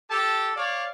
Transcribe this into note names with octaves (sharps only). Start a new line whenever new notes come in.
G4 A4 A5
C#5 D5 F5